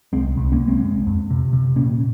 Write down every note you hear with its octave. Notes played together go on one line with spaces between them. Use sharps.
C2 G#3 C4
C2
A#3 C#4
C2
G#3 C4
F2
F2
C3
C3
A#2 A#3 C#4